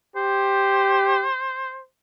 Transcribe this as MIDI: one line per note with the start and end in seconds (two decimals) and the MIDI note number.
0.16 1.28 67
0.16 1.82 72